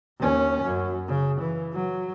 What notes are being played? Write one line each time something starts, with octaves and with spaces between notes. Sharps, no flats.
D#2 C#4
F#2
C#3
E3
F#3